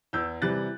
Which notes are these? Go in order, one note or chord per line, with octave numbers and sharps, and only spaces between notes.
E2 E6 G6
C3 E3 G3 F#6 A6